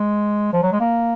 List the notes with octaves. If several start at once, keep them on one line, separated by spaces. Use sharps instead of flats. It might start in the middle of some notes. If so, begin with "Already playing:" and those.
Already playing: G#3
F3
F#3
G#3
A#3